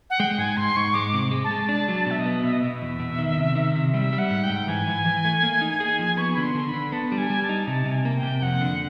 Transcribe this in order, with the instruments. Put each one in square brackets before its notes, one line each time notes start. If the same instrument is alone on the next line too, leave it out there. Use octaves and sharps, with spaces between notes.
[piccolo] F#5
[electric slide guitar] G#3 [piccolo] G5
[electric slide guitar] G#2 [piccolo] G#5
[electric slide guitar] G#2 [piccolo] C6
[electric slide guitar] G#2 [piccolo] C#6
[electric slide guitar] G#3 [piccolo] D6
[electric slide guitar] C3
G#3
[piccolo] A5
[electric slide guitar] G#3
[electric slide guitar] D4 [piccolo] A5
[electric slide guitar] F#3
[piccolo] A5
[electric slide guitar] B2 [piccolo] E5
[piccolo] D#5
[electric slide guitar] B3
[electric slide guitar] B2 [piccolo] E5
[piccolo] D#5
[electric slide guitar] B2 [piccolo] E5
[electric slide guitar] E2
B2
D#3
C3
D#3
C3
[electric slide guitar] G3 [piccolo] E5
[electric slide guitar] G3
[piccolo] F#5
[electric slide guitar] G#2
[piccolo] G5
[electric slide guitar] G#2
[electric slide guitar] E3 [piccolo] G#5
[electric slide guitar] E3
E3
A3
A#3
D#4
G#4
F3
[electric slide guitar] B3 [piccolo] C#6
[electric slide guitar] D3 [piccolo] B5
[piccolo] C6
[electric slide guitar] D3
[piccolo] B5
[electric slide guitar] D3
[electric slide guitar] B3 [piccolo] A5
[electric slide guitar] G3
[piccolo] G#5
[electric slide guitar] G3
[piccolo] A5
[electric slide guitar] D#4
[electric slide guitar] C3 [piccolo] A5
[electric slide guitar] C3
[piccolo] G#5
[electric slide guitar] A#3
[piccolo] G5
[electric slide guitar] C3
[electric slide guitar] F2 [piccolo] F#5
[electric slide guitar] D3